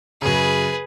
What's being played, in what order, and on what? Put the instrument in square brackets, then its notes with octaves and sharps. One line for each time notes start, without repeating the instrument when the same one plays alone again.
[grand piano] F#2 C#3 [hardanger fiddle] G#4 B4